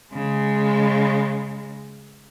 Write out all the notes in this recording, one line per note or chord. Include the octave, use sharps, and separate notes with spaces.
C#3 G#3